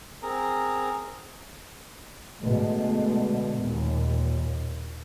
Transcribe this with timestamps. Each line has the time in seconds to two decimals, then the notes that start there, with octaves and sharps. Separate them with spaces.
0.22 C4 G#4 A#4 A#5
2.40 B2 D3 G#3 A3
3.57 D#2 A#2